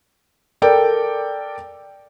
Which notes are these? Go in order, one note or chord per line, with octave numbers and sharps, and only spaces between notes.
A4 A#4 D5 G5